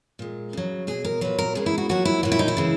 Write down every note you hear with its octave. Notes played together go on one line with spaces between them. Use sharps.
A#2 G#3
C#3 F#3
B2 F#3 G#4
A#4
A#2 F#3 B4
A#4
C#3 G#3 G#4
E4
F#4
A#2 F#3 F#4
E4
A#2 F#3 F#4
E4
D#4
E4
C#3 E3 G#3